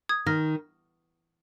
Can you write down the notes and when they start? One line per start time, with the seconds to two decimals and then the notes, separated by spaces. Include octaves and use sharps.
0.09 D#6 G#6
0.26 D#3 F6 A#6